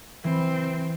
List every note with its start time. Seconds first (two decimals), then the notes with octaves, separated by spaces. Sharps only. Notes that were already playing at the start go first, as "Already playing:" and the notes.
0.24 E3 C4